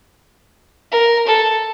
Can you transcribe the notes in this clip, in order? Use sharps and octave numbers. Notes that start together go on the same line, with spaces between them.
A#4
A4